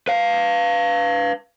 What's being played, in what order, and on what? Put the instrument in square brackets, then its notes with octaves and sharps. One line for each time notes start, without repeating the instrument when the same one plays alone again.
[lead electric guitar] B4 F5